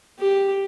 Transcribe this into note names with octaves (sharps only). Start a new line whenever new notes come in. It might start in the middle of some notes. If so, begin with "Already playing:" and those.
G4